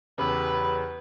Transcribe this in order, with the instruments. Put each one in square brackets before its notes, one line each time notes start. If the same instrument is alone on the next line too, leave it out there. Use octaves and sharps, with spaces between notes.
[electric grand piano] E2 C#3 [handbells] G4 B5 E6 [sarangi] B4